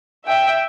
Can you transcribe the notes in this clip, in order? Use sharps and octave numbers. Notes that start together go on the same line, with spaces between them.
E5 G5